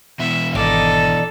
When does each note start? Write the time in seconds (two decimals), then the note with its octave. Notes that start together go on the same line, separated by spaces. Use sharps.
0.19 B2 E3 B3 E5
0.55 G#1 D4 D#4 A4